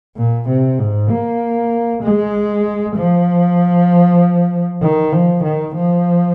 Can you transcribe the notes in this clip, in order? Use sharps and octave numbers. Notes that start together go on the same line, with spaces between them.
A#2
C3
G#2
A#3
G#3
F3
D#3
F3
D#3
F3